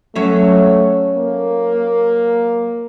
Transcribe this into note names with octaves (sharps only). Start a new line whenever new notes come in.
F#3 A3 C#4 E5
A#3